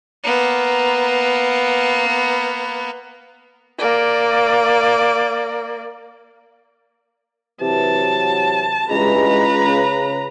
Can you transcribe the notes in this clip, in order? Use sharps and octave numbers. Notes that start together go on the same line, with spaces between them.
A#3 B3
A#3 D5
C3 E3 F#3 A5
C#2 G2 E3 G#3 B4 A#5
C#3